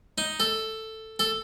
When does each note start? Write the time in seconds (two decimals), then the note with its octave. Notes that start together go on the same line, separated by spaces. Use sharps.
0.18 D#4
0.40 A4
1.19 A4